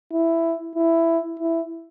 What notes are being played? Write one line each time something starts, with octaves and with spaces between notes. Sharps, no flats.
E4
E4
E4